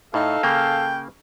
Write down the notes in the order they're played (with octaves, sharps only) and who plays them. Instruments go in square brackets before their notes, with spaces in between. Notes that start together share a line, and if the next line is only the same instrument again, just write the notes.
[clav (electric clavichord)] A2 [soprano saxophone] D#4 [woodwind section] A4 F5
[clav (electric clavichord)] C#3 A#3 [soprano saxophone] G5